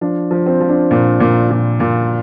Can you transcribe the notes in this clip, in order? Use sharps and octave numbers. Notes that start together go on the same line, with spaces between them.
F3 D4
F3
C4
F3
D4
A#2
A#2
A#2
A#2